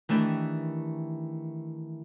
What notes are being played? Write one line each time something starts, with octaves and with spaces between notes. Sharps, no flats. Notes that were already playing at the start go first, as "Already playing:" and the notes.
D#3 E3 A3 D4 E4 G4